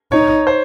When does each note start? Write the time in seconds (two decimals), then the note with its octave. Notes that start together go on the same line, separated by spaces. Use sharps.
0.12 D#4 C#5
0.47 C5